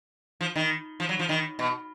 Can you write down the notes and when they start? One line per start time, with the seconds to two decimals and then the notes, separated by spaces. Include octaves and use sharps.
0.41 F3
0.56 D#3
1.00 F3
1.09 F#3
1.19 F3
1.29 D#3
1.59 B2